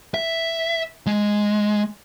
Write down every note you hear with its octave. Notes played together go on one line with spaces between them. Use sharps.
E5
G#3